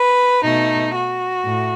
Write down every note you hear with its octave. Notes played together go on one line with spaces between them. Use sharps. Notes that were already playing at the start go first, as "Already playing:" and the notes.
Already playing: B4
B2 A3 D#4
F#4
A2